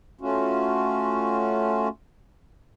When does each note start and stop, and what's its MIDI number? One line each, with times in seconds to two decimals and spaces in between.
0.21 1.88 57
0.21 1.88 61
0.21 1.88 65
0.21 1.88 66